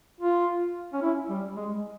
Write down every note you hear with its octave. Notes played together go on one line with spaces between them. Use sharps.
F4
C#4
E4
G3
G#3